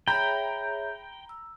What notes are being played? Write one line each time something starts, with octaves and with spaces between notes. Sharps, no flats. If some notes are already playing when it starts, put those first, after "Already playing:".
G#4 C#5 E5 G5 A#5 B5
E6